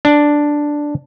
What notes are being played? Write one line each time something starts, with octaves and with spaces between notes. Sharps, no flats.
D4